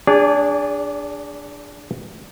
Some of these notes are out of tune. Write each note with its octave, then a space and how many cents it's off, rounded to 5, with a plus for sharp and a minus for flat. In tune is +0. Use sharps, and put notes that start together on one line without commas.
D4 +0 G#4 -20 D5 -35